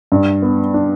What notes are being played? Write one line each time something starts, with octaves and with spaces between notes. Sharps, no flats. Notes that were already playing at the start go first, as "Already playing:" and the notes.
G2
B3
D4